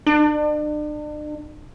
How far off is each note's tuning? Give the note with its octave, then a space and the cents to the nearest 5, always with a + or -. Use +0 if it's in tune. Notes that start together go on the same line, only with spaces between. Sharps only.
D4 +40